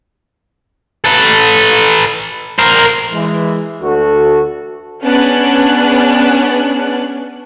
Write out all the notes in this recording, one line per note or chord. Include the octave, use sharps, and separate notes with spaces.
A4 B4
A#4 C5
E3 G#3
D2 F#4 A4
B3 C#4 D4 G#4 F#6